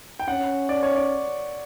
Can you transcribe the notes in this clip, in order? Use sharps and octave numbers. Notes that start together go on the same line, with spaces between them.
G5
C#4 F#5
D5
C#5
D5